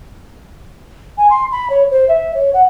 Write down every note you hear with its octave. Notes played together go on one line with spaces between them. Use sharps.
G#5
C6
B5
C#5
C5
E5
C#5
F#5